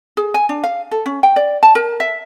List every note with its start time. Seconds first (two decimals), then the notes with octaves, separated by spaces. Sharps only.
0.17 G#4
0.34 G#5
0.49 D4
0.64 F5
0.91 A4
1.06 C#4
1.23 G5
1.36 D5
1.63 A5
1.75 A#4
2.00 E5